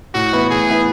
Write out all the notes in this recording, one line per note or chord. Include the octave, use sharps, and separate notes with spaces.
A2 F#4
E3 B3 E4 B4
A2 G#4
E3 B3 E4 B4